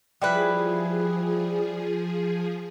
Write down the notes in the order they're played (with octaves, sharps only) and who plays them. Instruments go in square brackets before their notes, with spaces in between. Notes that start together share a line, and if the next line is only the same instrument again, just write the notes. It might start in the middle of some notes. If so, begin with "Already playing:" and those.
[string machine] F3 G#4 [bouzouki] G3 E4 B4